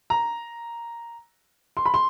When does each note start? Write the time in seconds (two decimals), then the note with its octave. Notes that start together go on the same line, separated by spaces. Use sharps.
0.10 A#5
1.77 C6
1.86 B5
1.94 C6